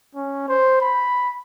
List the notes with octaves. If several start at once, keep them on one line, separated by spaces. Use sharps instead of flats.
C#4
C5
B5